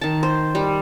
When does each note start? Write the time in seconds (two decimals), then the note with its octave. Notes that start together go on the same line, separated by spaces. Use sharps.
0.01 D#3 A5
0.23 C5
0.55 G3